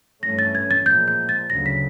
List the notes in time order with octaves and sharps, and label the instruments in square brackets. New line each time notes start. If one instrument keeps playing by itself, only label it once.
[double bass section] G2 E3 A3 C#4 [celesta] A#6
[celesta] A6
G#6
A6
[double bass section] A#2 F3 G#3 [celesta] G6
[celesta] G6
A6
[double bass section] D2 C#3 F#3 [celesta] A#6
[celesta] B6